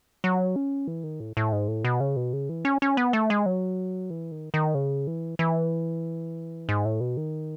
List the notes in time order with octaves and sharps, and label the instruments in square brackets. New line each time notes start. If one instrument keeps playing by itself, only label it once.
[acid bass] F#3
C#4
E3
D#3
A2
A2
G#2
A2
B2
C#3
B2
C#3
E3
C#4
C#4
B3
A3
G#3
F#3
E3
D#3
D#3
C#3
E3
E3
G#2
A2
B2
D#3